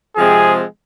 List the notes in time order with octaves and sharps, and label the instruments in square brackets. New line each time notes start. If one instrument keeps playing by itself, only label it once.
[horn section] C3 F3 G#3 C4 [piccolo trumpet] G#4